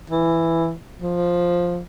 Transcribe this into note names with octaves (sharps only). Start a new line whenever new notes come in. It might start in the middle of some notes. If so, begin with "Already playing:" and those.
E3
F3